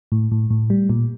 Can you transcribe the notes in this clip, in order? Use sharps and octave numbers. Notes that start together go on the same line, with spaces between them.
A2
A2
A2
G3
A#2